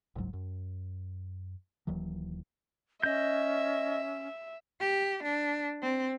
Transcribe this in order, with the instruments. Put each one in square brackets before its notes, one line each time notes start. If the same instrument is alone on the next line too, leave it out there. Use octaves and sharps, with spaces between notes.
[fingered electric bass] F#1 C#2 G#2 F#3
F#2
D#1 D#2 E3 F#3
[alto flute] C#4 [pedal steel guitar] D#5 G6 [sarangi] E5
[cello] G4
D4
C4